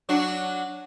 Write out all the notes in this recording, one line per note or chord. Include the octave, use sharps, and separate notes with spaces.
F#3 D4 F#4